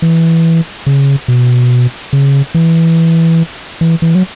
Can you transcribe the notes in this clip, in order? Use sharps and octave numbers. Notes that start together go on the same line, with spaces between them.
E3
C#3
B2
C#3
E3
E3
E3
F#3